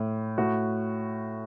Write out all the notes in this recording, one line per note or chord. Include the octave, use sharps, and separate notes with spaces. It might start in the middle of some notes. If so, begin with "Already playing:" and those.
Already playing: A2
A2 F#4